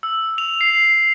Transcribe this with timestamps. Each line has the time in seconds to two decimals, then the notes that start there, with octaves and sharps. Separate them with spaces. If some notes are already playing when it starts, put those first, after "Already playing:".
0.03 E6
0.38 F7
0.61 C7